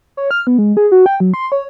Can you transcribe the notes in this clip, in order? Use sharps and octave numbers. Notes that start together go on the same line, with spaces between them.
C#5
F6
B3
G#3
G#4
F#4
G5
F#3
C6
C#5